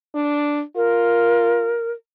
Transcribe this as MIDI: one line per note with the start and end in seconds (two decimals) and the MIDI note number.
0.15 0.62 62
0.76 1.78 65
0.76 1.91 70